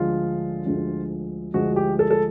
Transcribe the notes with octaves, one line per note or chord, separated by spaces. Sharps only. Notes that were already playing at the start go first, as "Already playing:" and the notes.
Already playing: D2 D3 F3 G#3 F4
D2 D3 F3 G#3
D2 D3 F3 G#3 F#4
G4
A4
A4